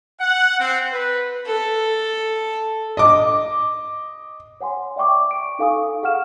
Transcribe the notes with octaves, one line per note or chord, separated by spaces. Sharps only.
F#5
C4
B4
A4
D#5 D6
C#5 F#5 G#5 C6
D5 E5 G5 C#6 D6
D7
D#4 A4 F5 G#5 C#6 D#6
G#4 F5 F#5 F6 E7